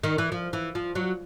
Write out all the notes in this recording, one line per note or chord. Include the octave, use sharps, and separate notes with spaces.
D#3
E3
F3
E3
F3
F#3